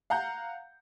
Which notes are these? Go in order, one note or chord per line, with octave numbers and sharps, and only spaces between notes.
F5 F#5 A#5 G6